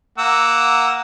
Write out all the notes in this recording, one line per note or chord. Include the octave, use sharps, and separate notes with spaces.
A#3 F#5 E6